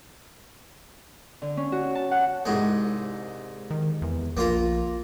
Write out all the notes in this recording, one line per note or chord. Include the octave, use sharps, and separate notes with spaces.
D3
C#4
F#4
A5
F#5
C2 G#2 G#3
D#3
E2
A#1 A#3 F4 A#4